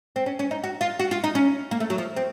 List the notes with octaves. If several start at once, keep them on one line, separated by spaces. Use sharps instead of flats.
C4
C#4
C#4
D#4
F#4
F4
F#4
F4
D#4
C#4
A#3
A3
F#3
F3
C4